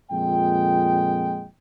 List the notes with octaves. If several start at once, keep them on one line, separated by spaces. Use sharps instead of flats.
F2 A#2 G#3 G5